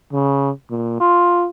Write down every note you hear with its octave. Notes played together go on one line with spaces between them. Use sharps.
C#3
A#2
F4